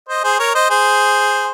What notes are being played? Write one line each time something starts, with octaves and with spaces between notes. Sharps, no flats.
C5 D#5
G#4 C5
A#4 C#5
C5 D#5
G#4 C5